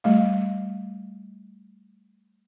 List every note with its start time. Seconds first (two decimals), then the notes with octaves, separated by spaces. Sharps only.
0.04 G3 A3 F5